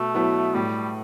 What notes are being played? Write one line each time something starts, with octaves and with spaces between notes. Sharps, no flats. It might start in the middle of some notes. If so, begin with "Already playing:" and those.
Already playing: B2 A3
F#3 B3 E4 B4
A2 G3